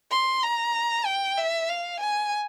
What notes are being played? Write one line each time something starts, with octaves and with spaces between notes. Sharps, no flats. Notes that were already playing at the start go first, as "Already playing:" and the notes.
C6
A#5
G5
E5
F5
G#5